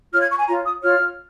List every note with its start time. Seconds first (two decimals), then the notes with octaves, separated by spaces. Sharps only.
0.12 F4 C#5 F6
0.21 G#6
0.30 C#6
0.38 G#5
0.47 F4 C#5 A#5
0.64 D#6
0.82 F4 C#5 F6